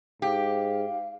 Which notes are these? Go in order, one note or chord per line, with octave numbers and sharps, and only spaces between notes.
G#2 G4 F5